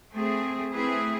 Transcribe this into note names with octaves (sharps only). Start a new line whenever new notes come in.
A3 C4 G#4
A3 C4 E4 G#4 B4